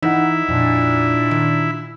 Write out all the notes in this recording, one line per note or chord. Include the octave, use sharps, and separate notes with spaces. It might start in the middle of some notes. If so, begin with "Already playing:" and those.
E3 D#4 E4 F#5
F2 A#2 D4
D#3